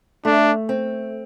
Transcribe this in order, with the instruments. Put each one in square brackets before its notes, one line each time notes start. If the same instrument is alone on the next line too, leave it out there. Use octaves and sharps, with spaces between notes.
[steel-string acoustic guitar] A3 [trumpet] D4
[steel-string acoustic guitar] C4